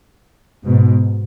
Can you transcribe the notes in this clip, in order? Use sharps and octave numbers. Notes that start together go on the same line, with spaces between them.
G#2 B2